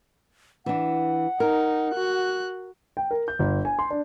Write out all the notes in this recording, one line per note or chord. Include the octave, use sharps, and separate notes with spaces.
E3 D4 F#5
D#4 A#4
F#4 F#6
G5
A#4
G6
G1
G#5
C6
D4